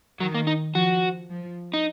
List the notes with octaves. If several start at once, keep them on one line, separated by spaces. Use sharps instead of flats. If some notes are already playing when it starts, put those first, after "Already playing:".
D#3 F#3
A#3
D#4
F3 F#4
F3
D#4